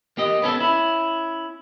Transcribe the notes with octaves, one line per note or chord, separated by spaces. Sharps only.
A#3 G4 D#5
B3 C#4 A4
C#4 E4